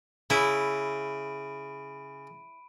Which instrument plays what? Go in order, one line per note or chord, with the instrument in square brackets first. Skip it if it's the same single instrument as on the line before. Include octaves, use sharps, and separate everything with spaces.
[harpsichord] C#3 [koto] E4 E5 [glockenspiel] B5 D7 D#7